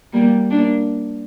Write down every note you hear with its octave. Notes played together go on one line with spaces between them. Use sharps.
G3 A#3
A#3 D4